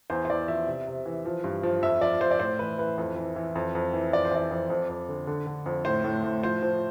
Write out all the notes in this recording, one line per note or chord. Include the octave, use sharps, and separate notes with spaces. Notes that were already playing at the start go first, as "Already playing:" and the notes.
E2 C5
C5
E2 D5
F3 E5
C3
C3
E3
F3
G2
F3
F2 E5
F3 D5
F3 C5
D5
A2 C5
E3 B4
E3 B4
F2
E3
E3
F2
F2
E3
F2 D5
C5
E3 D5
F2
F2
F2
D3
D3
D3
F2
A2 C5
A2
A2
F3 C5
F3